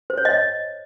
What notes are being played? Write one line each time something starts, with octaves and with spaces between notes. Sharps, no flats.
C5
C#5
D#5